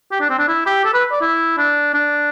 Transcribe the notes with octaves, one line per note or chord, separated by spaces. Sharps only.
G4
D4
C4
D4
E4
G4
A4
B4
D5
E4
D4
D4